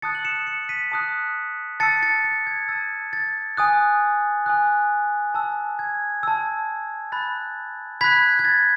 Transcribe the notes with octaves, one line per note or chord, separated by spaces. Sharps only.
A5 D#6 F#6 A6 C#7
F#7
C#7 E7
C#7 E7
B6 D#7
A5 D#6 F#6
A5 E6 A6 C#7
A6 C#7
A6
G#6
A5 E6 A6
A6
G#5 D#6 F#6
G#5 D#6 F#6
A5 E6
G#6
A5 E6
B5 F#6 A6
B5 F#6 G#6 B6
G#6
A6